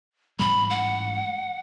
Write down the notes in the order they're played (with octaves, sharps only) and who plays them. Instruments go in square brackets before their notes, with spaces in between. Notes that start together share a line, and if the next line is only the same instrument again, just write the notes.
[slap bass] A1 G#2 G3 [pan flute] B5
[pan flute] F#5